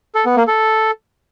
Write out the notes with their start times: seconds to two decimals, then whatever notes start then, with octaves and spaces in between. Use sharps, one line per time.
0.15 A4
0.26 B3
0.36 A#3
0.47 A4